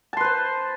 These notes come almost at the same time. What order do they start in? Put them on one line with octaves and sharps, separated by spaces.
A5 C6 B4 C5